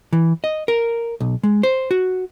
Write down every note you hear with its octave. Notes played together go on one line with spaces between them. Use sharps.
E3
D#5
A#4
B1
G#3
C5
F#4